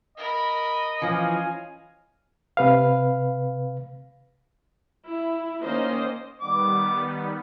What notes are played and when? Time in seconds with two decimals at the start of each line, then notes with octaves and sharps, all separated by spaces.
0.18 A#4 D#5 B5
1.02 E3 F3 C#4 F5 G#5
2.57 C3 B4 F5
5.06 E4
5.63 D#3 A#3 C#4 C5 D#5
6.41 D#3 G3 B3 D6